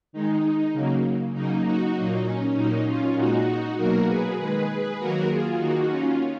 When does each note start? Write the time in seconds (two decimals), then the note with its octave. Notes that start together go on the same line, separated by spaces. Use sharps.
0.13 D#3 G#3 D#4
0.73 C#3 F#3 A#3
1.33 C#3 F#3 A#3 D#4
1.64 D#4 F#4
1.94 A#2 F#3 A#3 D#4
2.26 C#4
2.55 A#2 F#3 A#3 D#4
2.86 C#4 F4
3.16 A#2 G#3 D#4 F#4
3.77 B2 F#3 A#3 F#4 A#4
4.07 G#4 B4
4.37 D#3 G#3 G#4 B4
4.68 G#4 B4
4.99 D#3 F#3 A#3 F#4 A#4
5.29 F4 G#4
5.59 D#3 A#3 D#4 F#4
5.90 C#4 F4